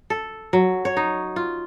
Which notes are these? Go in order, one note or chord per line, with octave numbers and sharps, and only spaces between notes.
A4
F#3
C#5
D#4
F4